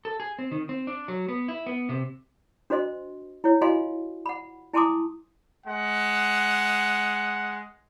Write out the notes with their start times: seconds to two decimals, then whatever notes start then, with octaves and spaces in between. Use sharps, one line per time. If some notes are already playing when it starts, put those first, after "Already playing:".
0.05 A4
0.20 G#4
0.39 C4
0.52 D#3
0.69 C4
0.87 D4
1.08 F#3
1.29 B3
1.48 E4
1.66 B3
1.89 C3
2.70 D4 F#4 C5 D#5 C6
3.44 E4 C#5
3.61 F4 F#4 D#5 F5 G#5 C6
4.26 F#5 B5
4.73 E4 G#5 A5 C6 D6 D#6
5.65 G#3 F#5